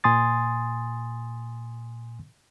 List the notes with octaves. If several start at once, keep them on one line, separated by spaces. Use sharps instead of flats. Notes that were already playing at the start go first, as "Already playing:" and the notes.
A#2 G#5 C6 D#6 A6